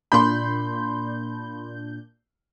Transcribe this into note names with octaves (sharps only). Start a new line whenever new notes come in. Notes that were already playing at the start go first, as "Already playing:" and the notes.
A#2 D4 B5 C6 G6